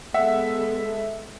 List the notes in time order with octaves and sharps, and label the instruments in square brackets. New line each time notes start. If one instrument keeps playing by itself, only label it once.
[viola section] G#3 B3 A4 [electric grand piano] E5 [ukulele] F#5